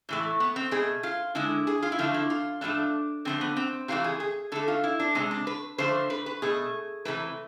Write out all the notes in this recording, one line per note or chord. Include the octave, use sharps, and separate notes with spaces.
A2 E3 A3
B3
C4
B2 A3 G#4
F4
D3 G#3 E4
G#4
F4
E4
D3 F3 A3 F4
E4
F4
A2 F3 A3 D4
D3 F3 A3 C4
B3
C4
C3 E3 A3 F4
G#4
G#4
D3 A3 A4
F4
E4
D4
C3 G#3 C4
D4
B4
D3 F3 A3 C5
B4
B4
B2 A3 G#4
C3 E3 A3 B4